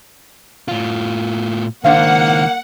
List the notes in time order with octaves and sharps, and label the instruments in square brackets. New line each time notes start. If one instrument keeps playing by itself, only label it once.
[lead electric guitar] A2 F4
[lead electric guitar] C#2 D#3 [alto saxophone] A#3 [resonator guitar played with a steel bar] D4 C5 F5 [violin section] F#5